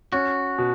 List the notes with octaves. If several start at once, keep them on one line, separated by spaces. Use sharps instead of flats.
C#4 F#4
B2